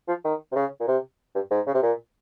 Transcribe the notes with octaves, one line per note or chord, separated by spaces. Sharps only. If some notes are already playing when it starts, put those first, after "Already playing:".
F3
D#3
C3
C#3
A#2
C3
G2
G#2
C#3
C3
A#2